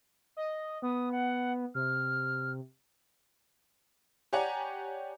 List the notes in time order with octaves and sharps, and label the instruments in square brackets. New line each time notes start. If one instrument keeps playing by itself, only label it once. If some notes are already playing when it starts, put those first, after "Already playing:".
[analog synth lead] D#5
[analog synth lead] B3 [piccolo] D#6
[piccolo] F#5
[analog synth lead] C3 [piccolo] F6
[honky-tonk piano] G4 C#5 D5 F#5 G#5 A#5